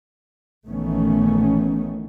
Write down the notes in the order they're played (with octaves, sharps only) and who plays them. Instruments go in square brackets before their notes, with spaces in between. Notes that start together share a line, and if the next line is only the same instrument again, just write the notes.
[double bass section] A#1 D#3 E3 A3 B3 C#4